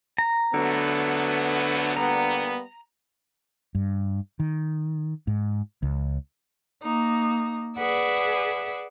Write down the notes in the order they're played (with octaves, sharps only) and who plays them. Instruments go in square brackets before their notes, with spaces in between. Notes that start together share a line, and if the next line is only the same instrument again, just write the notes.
[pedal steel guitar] A#5
[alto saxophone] D3 [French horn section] F#3 A3 B3
[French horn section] G3 A#3 B3 [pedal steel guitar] A#5
[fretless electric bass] G2
D#3
G#2
C#2
[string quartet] A#3 D#4
G#4 B4 D5 E5 F#5